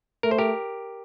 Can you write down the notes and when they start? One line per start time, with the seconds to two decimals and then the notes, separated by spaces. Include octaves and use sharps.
0.23 A3 A#4
0.31 C5
0.39 G4 A#4